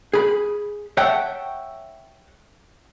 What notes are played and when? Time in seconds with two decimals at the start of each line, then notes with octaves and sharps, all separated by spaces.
0.13 G#4 B5
0.97 C#5 E5 F#5 G5 A5